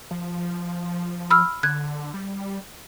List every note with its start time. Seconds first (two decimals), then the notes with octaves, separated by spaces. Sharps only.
0.11 F3
1.30 B5 E6 F6
1.63 D3 F#6 G#6
2.14 G3